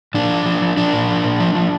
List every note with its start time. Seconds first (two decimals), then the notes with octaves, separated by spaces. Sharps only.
0.14 A#2 D4
0.30 F3
0.46 F3
0.62 F3
0.77 F3 D4
0.93 A#2
1.08 F3
1.25 A#2
1.40 F3
1.55 F3